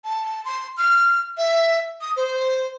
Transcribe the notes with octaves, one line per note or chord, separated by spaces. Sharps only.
A5
C6
F6
E5
D#6
C5